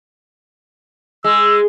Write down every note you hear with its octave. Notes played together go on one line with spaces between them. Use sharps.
G#3 E6